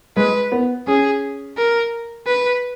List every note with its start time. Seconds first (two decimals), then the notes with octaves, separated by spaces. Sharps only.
0.17 G#3 B4
0.52 B3
0.87 C#4 G#4
1.57 A#4
2.27 B4